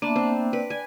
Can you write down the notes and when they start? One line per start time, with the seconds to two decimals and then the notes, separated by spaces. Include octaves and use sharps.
0.02 A#3 B3 D4 E5
0.16 C4
0.53 B4 D5
0.70 G#5